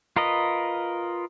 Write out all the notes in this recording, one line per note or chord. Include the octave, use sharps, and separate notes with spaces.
F4 A#4 B4 D#5